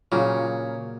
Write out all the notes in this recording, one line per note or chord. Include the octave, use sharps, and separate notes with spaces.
A#2 C#3 F#3 A#3